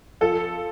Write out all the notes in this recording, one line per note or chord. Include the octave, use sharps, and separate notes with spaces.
F3 A4